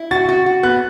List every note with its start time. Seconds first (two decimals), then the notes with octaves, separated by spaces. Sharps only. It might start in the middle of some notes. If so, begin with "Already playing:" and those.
Already playing: E4
0.11 F#4 A6
0.29 F#4
0.46 F#4
0.63 B3 F#6